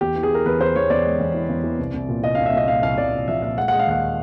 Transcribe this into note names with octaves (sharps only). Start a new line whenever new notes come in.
E2 G4
E3
G#4
E3 A#4
E2 B4
E2 C5
E2 C#5
E2 D5
G#3
E2
E3
E2
E3
C2
C2
A#2
C2 D#5
C2 F5
E5
C2 D#5
A#2 F5
C2 F5
C2 D5
C2
F3 E5
A#2 E5
G#3 F#5
G#3 F#5
F5
D#2 F#5